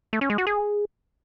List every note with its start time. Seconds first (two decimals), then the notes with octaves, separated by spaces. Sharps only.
0.13 A3
0.21 C#4
0.30 G#3
0.38 F#4
0.47 G#4